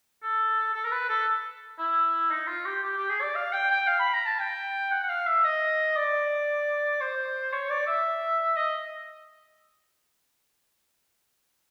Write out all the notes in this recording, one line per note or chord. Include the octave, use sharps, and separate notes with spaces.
A4
A4
A#4
B4
A4
E4
D#4
F4
G4
G4
G4
G#4
D5
F5
G5
G5
F5
B5
A#5
A5
G5
F#5
F#5
F5
E5
D#5
D5
C5
C#5
D5
E5
D#5